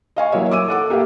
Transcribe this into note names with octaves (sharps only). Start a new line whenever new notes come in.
D#5 F5 G#5 C#6
E3 F#3 A#3 C#5 E5
D6 E6 D#7
A4 F#5 D6
A#3 G4 E5 F5